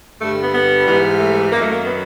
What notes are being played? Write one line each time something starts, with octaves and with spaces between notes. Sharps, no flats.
G2 D3 G3 A3
B3
B3
G#2 E3 G3
A3
F#2 D#3 F#3 A#3
A3
A#3
B3